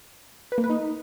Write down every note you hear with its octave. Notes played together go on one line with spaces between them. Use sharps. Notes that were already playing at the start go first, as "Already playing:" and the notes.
B4
A#3
B4
D#4